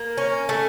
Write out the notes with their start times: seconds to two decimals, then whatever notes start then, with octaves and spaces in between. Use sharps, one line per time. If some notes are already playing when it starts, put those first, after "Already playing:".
Already playing: A#3
0.18 C#4
0.49 A3